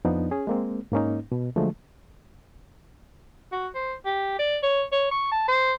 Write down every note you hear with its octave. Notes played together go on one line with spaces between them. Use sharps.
F2 F3 B3 D4 D#4
C#4 G#4
G#3 A#3 C4
G#2 A#3 C#4 D#4
B2
D3 F3 F#3 G#3 A3
F#4
C5
G4
D5
C#5
C#5
C#6
A5
C5